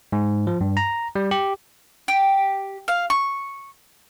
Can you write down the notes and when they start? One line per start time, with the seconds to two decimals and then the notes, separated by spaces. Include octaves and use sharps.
0.12 G#2
0.47 F3
0.61 G2
0.77 A#5
1.15 G3
1.31 G4
2.08 G4
2.88 F5
3.10 C#6